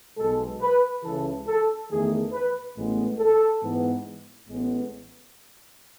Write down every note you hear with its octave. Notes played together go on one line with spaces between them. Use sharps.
B1 B2 G#3 A4
B4
C#2 C#3 E3 A4
A4
E2 D#3 A3 G#4
B4
A1 A2 G#3 B3
A4
G#2 E3 B3
A1 A2 G#3 B3